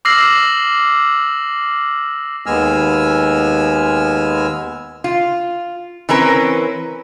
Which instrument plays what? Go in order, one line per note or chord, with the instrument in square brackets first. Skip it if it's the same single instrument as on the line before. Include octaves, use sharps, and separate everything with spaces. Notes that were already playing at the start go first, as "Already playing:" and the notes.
[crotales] D6 E6 F6 A#6 C7 F#7
[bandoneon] D#2 G#3 B3 G#5 E6 F6
[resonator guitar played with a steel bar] F4
E3 C4 C#4 A#4 B4